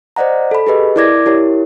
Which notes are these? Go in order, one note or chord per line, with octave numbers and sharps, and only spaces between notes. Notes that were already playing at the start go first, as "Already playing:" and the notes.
C5 D5 D#5 F#5 A#5
A4 B5
G4 G#4 B4 D#5
E4 A#4 D5 D6 G#6 A#6
E4 G4 A#4 C#5